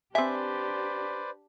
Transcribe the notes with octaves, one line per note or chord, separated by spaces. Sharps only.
C4 D4 G4 B4 C5 D5 E5 G#5